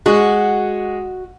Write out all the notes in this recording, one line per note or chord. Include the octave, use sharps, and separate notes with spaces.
G#3 F#4